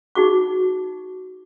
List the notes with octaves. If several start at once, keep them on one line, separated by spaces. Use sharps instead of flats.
D#4 F#4 G#4 C#6